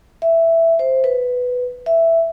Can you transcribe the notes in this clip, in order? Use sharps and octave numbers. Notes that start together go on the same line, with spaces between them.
E5
C5
B4
E5